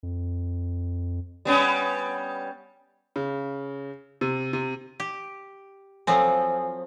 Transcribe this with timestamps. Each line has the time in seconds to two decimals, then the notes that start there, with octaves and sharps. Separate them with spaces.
0.03 F2
1.45 G3 B3 C#4
3.16 C#3
4.21 C3
4.53 C3
5.00 G4
6.07 F3 F#3 C4 A4 G#5